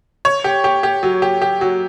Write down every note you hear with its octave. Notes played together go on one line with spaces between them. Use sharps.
C#5
G4
G4
G4
F#3
G4
G4
F#3